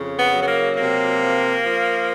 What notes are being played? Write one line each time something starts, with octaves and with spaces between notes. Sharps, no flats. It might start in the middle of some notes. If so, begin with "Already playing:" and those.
Already playing: F2 C#3
B3
F#3
B3
A#3
C3 A#3
F3
F3